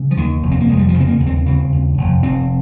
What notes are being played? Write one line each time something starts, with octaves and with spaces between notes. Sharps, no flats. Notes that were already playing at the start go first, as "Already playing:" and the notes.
Already playing: C#3
F3
D#2 D#3
F1
C4
A#3
F1 G#3
G3
F3
C#3
C4
A#3
D#2
C4
C#3 C4
D#2
F1
F1 C4